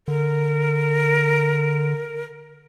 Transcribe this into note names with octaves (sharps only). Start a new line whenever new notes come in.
D3 A#4